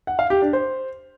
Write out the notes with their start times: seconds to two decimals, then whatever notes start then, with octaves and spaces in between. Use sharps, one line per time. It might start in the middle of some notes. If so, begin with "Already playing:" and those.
0.07 F#5
0.19 F5
0.30 G4
0.42 D4
0.53 C5